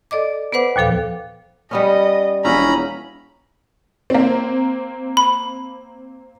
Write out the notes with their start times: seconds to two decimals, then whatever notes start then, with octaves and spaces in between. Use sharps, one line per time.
0.11 A4 D5 D#5 D6
0.52 B3 B4 C5 F#5 D6
0.76 D#2 A#2 F3 A4 F5
1.71 G3 B3 C#4 D#5
2.45 E1 F3 C#4 E4 A#5 B5
4.10 A#3 C4
5.17 B5